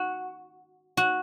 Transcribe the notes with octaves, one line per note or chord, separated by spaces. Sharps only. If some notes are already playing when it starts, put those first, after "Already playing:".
Already playing: F#4
F#4